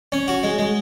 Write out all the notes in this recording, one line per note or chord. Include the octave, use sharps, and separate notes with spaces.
C#4
F#4
G#3
G#3